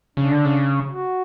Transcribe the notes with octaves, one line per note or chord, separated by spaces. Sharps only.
C#3 D4
D3
C#3
F#4